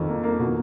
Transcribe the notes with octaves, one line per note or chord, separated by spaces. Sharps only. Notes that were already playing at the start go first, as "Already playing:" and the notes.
Already playing: F2 D#3
A#3
A#3
B2